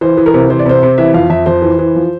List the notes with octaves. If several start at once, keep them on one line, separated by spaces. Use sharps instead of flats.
E3 C5
E3
A#4
C3
E3 C5
D5
C3 C5
C3
E3 E5
F2 F5
F2 E5
F2 C5
E3
E3
F3